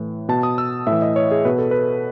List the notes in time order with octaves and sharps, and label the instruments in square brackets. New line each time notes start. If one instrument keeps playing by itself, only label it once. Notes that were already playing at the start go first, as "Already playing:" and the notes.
Already playing: [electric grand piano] A2 E3
B2 A5
D#6
E6
A2 E3 E5
D#5
C#5
G#4
B2 B4
A4
B4